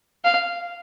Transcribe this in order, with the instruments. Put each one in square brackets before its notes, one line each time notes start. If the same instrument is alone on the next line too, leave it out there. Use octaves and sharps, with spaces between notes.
[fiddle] F5